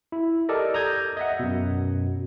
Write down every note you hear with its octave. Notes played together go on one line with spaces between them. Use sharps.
E4
G4 A4 A#4 D5 D#5
A#5 D#6 G6 G#6
D#5 E5 F#5
F#2 B2